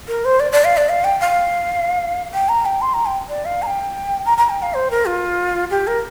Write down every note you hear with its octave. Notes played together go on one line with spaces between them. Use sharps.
A#4
C5
D5
D5
F5
D5
F5
G5
F5
G5
A#5
G5
C6
A#5
G5
D5
F5
A#5
G5
A#5
A#5
G5
F5
C5
A#4
F4
G4
A#4